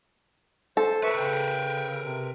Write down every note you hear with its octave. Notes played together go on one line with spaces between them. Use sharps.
A4 C5
A#4 B4 E5 C#6
C#3 G5
C3